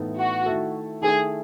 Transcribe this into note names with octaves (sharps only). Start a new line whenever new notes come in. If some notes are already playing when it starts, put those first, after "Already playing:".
Already playing: A2 E3 B3 D#4 A4
F#4
D#3 A3 E4 A4
D#3 A3 E4 G#4 A4